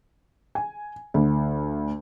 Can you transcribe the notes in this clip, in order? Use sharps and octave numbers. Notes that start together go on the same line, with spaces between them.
G#5
D2